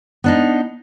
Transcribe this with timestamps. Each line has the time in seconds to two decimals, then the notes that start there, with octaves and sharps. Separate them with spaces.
0.24 B3 D4 D#4